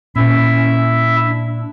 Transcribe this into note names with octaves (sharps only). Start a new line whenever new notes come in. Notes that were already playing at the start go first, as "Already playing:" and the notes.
A#2 C#4 E4 E5
D4